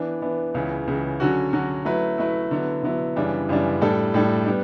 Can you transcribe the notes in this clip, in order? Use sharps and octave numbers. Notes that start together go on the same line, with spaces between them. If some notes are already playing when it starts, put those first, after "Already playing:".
Already playing: E3 B3 D4
E3 B3 D4
C#2 C#3 E3
C#2 C#3 E3
D3 F#3 C#4 F#4
D3 F#3 C#4 F#4
F#3 A3 E4 B4
F#3 A3 E4 B4
D3 F#3 B3 E4
D3 F#3 B3 E4
F#2 C#3 E3 G3 D4
F#2 C#3 E3 G3 D4
A2 G3 D4 A4
A2 G3 D4 A4
G3 B3 D4